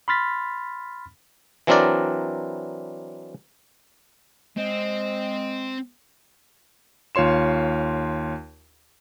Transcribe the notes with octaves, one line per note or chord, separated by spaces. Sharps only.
B5 C6 F6 A6 B6
E3 F#3 C4 D4 A#4 D5
G#3 C4
D#2 F4 C#5 C6 E7